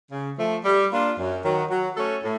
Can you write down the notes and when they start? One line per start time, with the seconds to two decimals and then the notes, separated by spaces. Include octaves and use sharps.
0.11 C#3
0.37 F3 A3
0.64 G3
0.90 A#3 D4 F4
1.17 F#2
1.43 D#3 F#3
1.69 F#3
1.96 A3 C#4 F#4 A4
2.23 A2